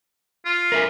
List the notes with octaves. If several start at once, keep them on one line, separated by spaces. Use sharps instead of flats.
F4
A#4 E5 G#5